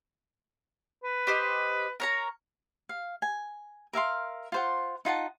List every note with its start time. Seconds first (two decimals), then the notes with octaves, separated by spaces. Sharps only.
1.04 B4
1.27 G4 C5 D#5
2.00 A#4 C#5 A#5
2.89 F5
3.22 G#5
3.93 A#4 E5 F5 C6
4.52 F4 C5 F#5
5.05 D#4 F4 F#5 A5